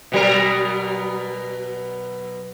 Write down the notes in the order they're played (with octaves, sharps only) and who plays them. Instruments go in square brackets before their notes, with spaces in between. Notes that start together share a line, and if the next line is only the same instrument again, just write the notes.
[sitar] B2 F#3 A#4